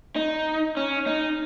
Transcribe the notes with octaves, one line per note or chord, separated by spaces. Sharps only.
D#4
C#4
D#4